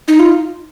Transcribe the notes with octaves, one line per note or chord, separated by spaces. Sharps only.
D#4
F4